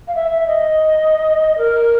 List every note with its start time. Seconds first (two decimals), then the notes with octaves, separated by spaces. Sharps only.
0.08 F5
0.15 E5
0.31 E5
0.47 D#5
1.58 A#4